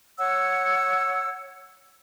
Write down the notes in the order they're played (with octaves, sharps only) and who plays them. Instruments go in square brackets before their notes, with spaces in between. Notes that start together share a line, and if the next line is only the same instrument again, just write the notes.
[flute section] C#5 F#5 E6